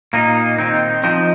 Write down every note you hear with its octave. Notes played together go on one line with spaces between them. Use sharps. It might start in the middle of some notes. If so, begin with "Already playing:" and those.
A#2 A#3 D#4
D#3 C4 D#4
F3 C4 D#4